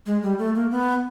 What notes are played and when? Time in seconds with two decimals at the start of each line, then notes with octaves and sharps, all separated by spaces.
0.06 G#3
0.23 G3
0.39 A3
0.55 A#3
0.71 B3